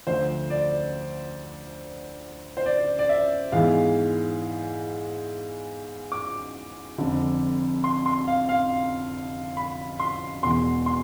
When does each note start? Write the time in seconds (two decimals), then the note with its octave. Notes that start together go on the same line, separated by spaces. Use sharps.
0.07 D2 D3 F3 A3 C5
0.50 D5
2.57 C5
2.66 D5
2.99 D5
3.09 E5
3.52 G#2 E3 G#3 B3 F5
6.12 D6
6.98 F1 F2 D3
7.84 C6
8.06 C6
8.28 F5
8.49 F5
9.57 B5
10.00 C6
10.43 E1 E2 B2 C6
10.86 C6